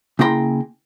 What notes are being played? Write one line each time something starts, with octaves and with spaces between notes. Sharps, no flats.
C#3 A#3 E4 G5 A#5 C6